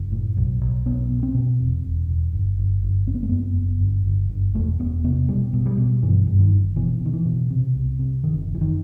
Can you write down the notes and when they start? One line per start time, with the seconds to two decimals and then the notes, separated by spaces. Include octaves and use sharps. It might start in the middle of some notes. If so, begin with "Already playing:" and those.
Already playing: F#1
0.12 A2
0.37 B1
0.61 B1
0.86 B1 B3
1.11 B2
1.23 C4
1.34 B2
1.59 E1
1.84 E1
2.09 E1
2.33 G1
2.58 G1
2.83 G1
3.07 F#1 C4
3.15 B3
3.23 A3
3.29 F#2 B3
3.56 F#1
3.81 G1
4.06 G1
4.30 G1
4.54 E1 A3
4.79 E1 B3
5.04 C3 B3
5.28 B2 G3
5.53 B2
5.66 G3
5.78 B2
6.03 G2 E3
6.27 G2
6.39 D#3
6.52 G1
6.76 B2 E3
7.01 B2 D#3
7.13 E3
7.26 B2
7.51 C3
7.75 C2
7.99 C3
8.24 F#1 D#3
8.48 F#1
8.55 E3
8.61 D#3